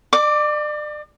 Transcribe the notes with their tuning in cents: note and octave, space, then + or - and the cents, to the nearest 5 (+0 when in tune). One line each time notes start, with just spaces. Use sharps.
D5 +35 D6 +0